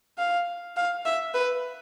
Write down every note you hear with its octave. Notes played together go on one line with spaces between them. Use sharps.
F5
F5
E5
B4